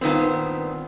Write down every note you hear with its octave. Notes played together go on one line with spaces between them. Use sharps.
G2 A#2 D#3 B3 C4